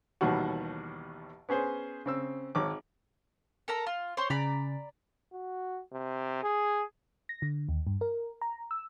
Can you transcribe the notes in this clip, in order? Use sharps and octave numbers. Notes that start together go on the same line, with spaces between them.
A1 D#2 B2 D#3 G3 F#4
B3 C#4 G#4 C5
C#3 C4 E6
G#1 C#5 D6
A4 A#4 A#5
F4
C5 C#5 C6
C#3 D5 A#5 B5
F#4
C3
G#4
A#6
D3
D#2
G2
A#4
A#5
E6